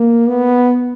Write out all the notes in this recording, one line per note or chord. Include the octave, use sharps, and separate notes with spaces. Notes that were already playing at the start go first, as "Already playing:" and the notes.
Already playing: A#3
B3